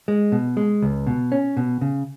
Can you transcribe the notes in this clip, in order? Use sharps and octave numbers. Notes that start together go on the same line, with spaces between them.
G#3
B2
G#3
C#2
B2
C#4
B2
C#3